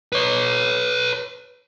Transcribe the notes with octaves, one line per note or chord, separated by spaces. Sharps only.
B4 C#5